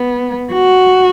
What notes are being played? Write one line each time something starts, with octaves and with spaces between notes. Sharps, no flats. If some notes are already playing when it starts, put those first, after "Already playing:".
Already playing: B3
F#4